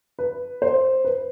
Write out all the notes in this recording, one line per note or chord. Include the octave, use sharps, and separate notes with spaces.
B4
C5
B4